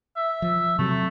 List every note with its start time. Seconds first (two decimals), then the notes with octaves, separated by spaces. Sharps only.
0.16 E5
0.42 F3
0.79 C3 F#3 A3